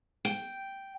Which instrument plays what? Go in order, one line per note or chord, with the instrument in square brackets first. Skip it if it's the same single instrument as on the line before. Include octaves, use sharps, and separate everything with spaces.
[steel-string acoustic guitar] G5